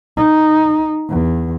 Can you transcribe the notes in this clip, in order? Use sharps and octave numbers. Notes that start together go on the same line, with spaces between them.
D#4
E2